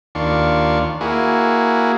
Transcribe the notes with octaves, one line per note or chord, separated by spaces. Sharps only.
D#2 D4 F4 C#6
A#3 E4 F#4 G#4